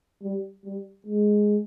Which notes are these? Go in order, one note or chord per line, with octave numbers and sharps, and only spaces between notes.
G3
G3
G#3